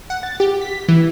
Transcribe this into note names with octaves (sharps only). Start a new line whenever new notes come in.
F#5
A6
G4
B6
E3